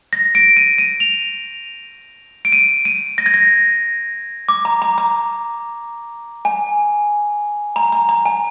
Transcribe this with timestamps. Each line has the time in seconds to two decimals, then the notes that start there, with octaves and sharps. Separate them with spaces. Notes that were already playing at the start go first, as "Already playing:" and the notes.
0.13 A#6
0.35 D7
0.57 D#7
0.78 D#7
1.00 F7
2.45 D7
2.52 D#7
2.85 D#7
3.18 A#6
3.26 G#6
3.34 A#6
4.49 D6
4.65 A#5
4.82 A#5
4.98 A#5
6.45 G#5
7.76 A#5
7.92 A#5
8.09 A#5
8.26 G#5